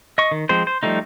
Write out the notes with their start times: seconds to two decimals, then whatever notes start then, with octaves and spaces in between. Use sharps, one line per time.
0.18 D#5 C#6
0.31 D#3
0.49 F3 G#3 C4 C5
0.67 C5
0.83 F3 G3 A3 D#4